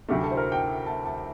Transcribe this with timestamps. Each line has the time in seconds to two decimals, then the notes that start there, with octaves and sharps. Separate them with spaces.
0.09 D2 C3 F#3 A3 G4
0.23 A4
0.31 C5
0.37 A#4
0.52 G5
0.86 A5
1.06 A5